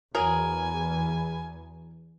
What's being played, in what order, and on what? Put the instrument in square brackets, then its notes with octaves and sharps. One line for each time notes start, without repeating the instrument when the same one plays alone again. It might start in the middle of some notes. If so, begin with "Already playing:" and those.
[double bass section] E2 [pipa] F#3 G#4 A#4 [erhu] G#5